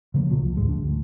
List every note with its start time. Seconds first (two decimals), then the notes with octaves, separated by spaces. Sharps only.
0.14 C#3 F3 G#3 A#3
0.30 A#1 B2 F3 F#3
0.42 C2
0.57 D1 G#1 G#2 G#3
0.69 D2 D4
0.83 D2